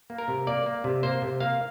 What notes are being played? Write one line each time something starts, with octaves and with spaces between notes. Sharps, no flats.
A#3
A#4
C3
A#3 D5
A#3
C3
A#3 C5
C3
A#3 F5